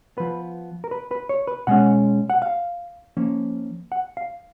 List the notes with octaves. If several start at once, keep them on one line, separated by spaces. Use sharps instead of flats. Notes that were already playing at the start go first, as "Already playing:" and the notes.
F3 B3 B4
A#4
B4
B4
C#5
B4
B2 G#3 C#4 F#5
F#5
F5
F3 A#3 C#4
F#5
F5